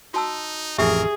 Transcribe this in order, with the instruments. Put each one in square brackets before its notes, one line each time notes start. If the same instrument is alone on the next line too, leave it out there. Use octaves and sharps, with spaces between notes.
[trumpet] D#4 [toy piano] F#4 A5 E6
[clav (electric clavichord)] A1 F2 [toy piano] G4 E5 [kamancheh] G#4 [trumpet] A#4